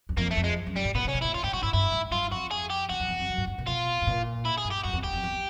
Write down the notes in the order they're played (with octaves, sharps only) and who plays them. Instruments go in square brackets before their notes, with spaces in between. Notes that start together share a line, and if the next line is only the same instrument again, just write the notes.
[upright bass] E2
[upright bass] F2 [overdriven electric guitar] A#3
[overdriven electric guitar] A3
[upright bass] F2
[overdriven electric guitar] G#3
[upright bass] F#2
[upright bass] G#2 [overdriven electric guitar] G3
[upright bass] A2
[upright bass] A#2 [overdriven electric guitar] B3
[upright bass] C#3 [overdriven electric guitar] C#4
[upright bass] B2
[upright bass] A#2 [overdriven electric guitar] E4
[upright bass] A2 [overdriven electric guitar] F4
[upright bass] G#2 [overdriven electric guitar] G4
[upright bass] A2 [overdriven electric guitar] F#4
[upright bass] G#2 [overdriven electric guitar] E4
[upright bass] G2 [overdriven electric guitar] E4
[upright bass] G#2
[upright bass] G2 [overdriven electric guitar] F4
[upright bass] F2 [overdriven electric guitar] F#4
[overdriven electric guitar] G#4
G4
[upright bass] E2 [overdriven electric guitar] F#4
[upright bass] F2
E2
F2
F#2
G#2
G2
A#2
[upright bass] B2 [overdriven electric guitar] F4
[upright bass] A2
A#2
[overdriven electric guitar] E4
G#4
[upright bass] G2
[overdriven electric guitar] G4
[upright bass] F#2 [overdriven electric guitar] F#4
[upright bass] F2
[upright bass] E2 [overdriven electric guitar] G4
[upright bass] F2
E2